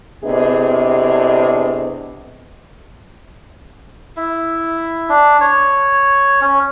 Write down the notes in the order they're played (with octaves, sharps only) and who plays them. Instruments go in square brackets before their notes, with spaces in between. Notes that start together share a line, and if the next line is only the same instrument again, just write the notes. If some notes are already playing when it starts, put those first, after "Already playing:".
[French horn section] A2 C3 B3 D4 G#4 D#5
[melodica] E4
D4
C#5
C#4